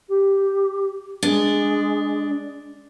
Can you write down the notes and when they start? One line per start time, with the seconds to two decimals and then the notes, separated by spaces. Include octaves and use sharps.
0.09 G4
1.23 G#3 D4